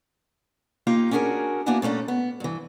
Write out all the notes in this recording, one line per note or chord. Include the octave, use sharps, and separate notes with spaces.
A#3 D#4 F4 G4
C#4 D4 F#4 G#4 A#4
A#3 B3 D4 E4 F#4 G#5
A#2 A3 C#4 D4
B3
G2 E3